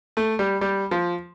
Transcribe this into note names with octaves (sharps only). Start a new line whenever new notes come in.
A3
G3
G3
F3